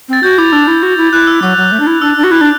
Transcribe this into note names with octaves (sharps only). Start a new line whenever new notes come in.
C4 A6
F#4 G6
E4 D6
D4 E6
E4
F#4
E4
E4 F#6
E6
F#3 D6
F#3
A3
D4
E4
D4 E6
D4
F#4
E4 F#6
D4